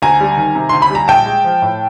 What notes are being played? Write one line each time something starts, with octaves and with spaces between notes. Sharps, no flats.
D2 G#5 A#5
G3
D#3
C3
D2 C6
B5
G3 A#5
A#1 G5 A5
G#3
F3
A2